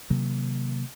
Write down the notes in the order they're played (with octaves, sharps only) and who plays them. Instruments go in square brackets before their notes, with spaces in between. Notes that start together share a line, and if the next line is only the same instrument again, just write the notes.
[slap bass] C3 D#3 F#3 A#3